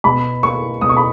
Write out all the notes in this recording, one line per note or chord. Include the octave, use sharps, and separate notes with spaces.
B2 B5
A#3 C#6
B2 D#6
C#6
B5